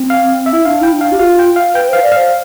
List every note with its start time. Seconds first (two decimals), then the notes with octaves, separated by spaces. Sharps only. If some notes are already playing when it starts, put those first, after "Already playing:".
Already playing: C4
0.10 F5
0.46 E5
0.53 E4
0.65 D4 F5
0.81 E4 G5
0.92 D4
1.01 F5
1.12 G4
1.19 F4 F5
1.39 G5
1.56 F5
1.74 B4 G5
1.88 C5 F5
2.03 D5
2.12 C5 F5